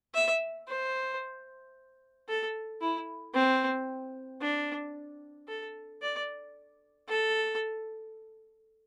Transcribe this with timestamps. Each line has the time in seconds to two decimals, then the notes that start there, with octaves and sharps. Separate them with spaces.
0.14 E5
0.67 C5
2.29 A4
2.81 E4
3.34 C4
4.42 D4
5.48 A4
6.02 D5
7.08 A4